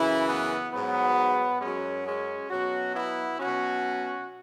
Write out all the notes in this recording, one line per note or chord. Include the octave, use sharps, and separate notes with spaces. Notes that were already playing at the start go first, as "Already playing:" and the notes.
Already playing: F#2 C#3 E3 E4
B3
G#2 F#3 B3
F#2 F#3 G#3 C#4
G#3 C#4
B2 F#3 C#4 F#4
B3 E4
B2 F#3 C#4 F#4